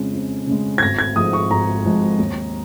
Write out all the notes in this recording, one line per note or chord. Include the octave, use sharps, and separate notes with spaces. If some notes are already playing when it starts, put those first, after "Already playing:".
Already playing: F2 C#3 G#3
F2
C#3 G#3
G#6
G#1 A#6
G#6
G#2 F3 G#3 D#6
C#6
G#1 A#5
G#2 F3 G#3
D#2